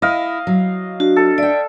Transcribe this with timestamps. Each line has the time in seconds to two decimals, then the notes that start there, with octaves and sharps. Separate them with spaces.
0.02 E4 D#5 F5
0.47 F#3
1.00 D4 F#4
1.16 A4
1.38 D5 E5 G5